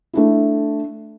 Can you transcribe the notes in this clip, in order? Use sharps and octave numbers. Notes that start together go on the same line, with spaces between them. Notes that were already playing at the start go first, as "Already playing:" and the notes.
A3 D4 E4